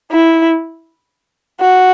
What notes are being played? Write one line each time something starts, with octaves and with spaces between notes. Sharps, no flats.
E4
F#4